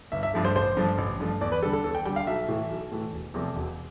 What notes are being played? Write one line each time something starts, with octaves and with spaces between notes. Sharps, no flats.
G1 E5
E5
G2 F3 A3
C5
A1 C5
G2 F3 A3
A1
G2 F3 A3
E2 D5
B4
D3 G3 A4
A4
E2 A4
G5
D3 G3 G5
F5
B1 E5
A2 E3 A3
B1
A2 E3 A3
E1
E2 C3 F3 A3
E1